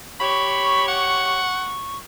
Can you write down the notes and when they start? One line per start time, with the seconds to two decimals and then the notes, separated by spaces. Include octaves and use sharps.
0.20 G4 C#5 B5 C#6
0.88 F#5